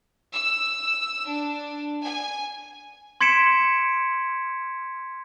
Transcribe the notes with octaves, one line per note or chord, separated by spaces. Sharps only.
E6
D4
G#5
C6 G#6 B6 C#7 D7 E7